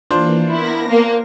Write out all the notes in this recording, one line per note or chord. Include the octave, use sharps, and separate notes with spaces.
E3 A#3 D4 F4 C5
B3 E4 A#4 A#6
A#3